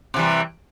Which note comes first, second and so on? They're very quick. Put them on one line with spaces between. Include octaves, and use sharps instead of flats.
C3 E3 G3